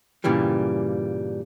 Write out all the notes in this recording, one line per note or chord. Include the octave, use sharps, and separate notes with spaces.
G2 A#2 C#3 E3 G3